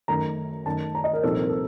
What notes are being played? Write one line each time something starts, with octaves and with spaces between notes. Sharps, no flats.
F#2 D#3 A3 A#5
F#2 D#3 A3 A5
A#5
D#5
A#4
C2 A#2 F3 C4 D#4 A4
A#4
A4